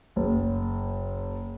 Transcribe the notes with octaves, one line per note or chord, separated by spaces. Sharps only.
F#1